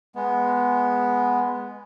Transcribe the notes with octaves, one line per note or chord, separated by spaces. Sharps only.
G#3 B3